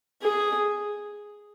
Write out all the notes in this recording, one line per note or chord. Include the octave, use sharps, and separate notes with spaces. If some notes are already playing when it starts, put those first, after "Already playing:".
G#4